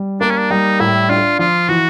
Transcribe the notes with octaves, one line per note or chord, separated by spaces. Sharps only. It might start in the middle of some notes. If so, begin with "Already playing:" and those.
Already playing: G3
A#3 D4
C#4
D4
G3 D#4
A2 E4
D4 F4
F3 F4
E3 F#4